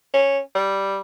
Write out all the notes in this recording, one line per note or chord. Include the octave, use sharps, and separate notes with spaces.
C#4
G3